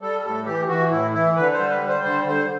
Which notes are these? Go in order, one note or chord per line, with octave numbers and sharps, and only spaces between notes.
G3 A4
A2 A4
E3 G4
E3 F#4
A2 E4
E3 E4
D3 B4
C5
G3
B4
G3
C5
D3 C5
D3 C5